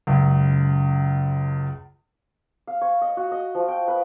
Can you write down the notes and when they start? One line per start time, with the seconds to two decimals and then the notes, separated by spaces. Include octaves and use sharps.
0.07 C#2 F#2
2.67 F5
2.81 C#5
3.02 D#5
3.17 F#4
3.31 D#5
3.55 F3
3.68 G5
3.88 B4